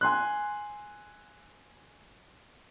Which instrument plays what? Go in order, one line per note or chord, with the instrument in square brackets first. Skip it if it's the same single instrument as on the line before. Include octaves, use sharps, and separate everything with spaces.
[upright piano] G#5 C6 F#6